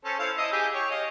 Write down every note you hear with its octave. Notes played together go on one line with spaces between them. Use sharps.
C#4 A4 C5
E4 C5 F5
E4 D#5
G4 G#4
C#5 G5
D#5 F5